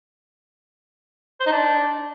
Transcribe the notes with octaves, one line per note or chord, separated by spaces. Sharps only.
C5
D#4
D4